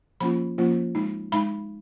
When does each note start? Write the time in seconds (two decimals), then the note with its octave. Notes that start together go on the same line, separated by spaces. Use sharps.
0.20 F3 A#3 C#4 F4 B5
0.58 F3 A#3 C#4 F4
0.95 G#3 D#4
1.32 G#3 D#4 B5